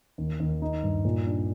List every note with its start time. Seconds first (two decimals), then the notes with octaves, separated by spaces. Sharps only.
0.18 D#2
0.40 D#2
0.62 D#4
0.83 G2
1.05 A#2
1.27 D4